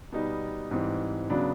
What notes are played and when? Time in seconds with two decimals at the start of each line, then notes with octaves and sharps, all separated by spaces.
0.12 B2 G3 B3 D#4
0.71 G#2 E3 G3 C4
1.30 C#3 F#3 B3 D4